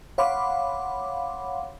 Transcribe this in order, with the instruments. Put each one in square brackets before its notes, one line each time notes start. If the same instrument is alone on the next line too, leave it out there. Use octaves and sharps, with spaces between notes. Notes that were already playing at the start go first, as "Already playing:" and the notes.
[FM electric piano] C#5 F5 F#5 B5 C6 D6